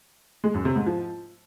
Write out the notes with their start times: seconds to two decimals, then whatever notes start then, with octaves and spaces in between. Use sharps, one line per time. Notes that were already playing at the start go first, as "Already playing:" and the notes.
0.44 G#3
0.54 F#2
0.65 C3
0.76 G#2
0.86 F3